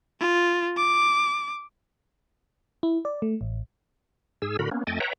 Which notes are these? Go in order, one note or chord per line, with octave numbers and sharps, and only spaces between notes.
F4
D6
E4
D5
A3
A1
G#2 G#4 E6
A2 D3 F#4 A#4 B5
A#3 B3 C#4
F2 A3 D#5 G5 G#5 A6
B4 C#5 E5 F#5 G5 A#5